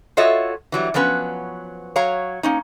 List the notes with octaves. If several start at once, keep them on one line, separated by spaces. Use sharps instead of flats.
F4 F#4 A4 C#5 D#5 E5
E3 F#3 G3
F3 F#3 B3 C#4 B4
F#3 C#5 F5 A#5
A#3 C#4 D#4